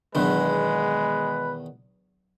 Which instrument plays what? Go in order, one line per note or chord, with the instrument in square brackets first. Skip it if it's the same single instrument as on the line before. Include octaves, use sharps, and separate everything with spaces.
[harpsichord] E2 B2 D#3 [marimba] F#3 D4 [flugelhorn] G#3 [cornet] B4